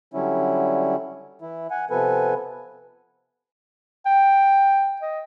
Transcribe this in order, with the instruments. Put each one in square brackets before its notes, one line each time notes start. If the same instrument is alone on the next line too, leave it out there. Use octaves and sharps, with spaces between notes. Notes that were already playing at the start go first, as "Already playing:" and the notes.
[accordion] D3 F#3 G3 C#4 E4
E3 E4
F#5 G#5
C3 F3 B3 A4 B4 G#5
[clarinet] G5
D#5